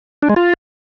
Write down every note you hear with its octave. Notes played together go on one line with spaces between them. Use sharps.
D4
G#3
F4